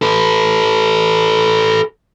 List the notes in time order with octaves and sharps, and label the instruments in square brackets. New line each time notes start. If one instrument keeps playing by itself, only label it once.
[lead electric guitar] A4 B4